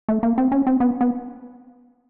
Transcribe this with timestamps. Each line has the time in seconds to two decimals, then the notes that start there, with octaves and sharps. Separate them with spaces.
0.09 A3
0.23 A#3
0.38 C4
0.52 C#4
0.67 C4
0.80 B3
1.01 B3